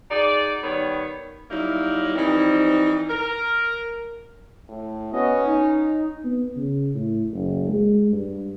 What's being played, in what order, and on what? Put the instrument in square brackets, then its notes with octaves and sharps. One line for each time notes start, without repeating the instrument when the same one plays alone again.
[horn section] D#4 F#4 G#4 D5
D#3 G3 B3 C#5
[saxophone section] F#3 G3 A#3 D#4 E4
E3 F3 G3 C4 D#4
A#4
[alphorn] A2
[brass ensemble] B3 F#4 D#5 [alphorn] C#4
[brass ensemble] D#4
[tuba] B3
C#3
A2
F#1
G#3
G2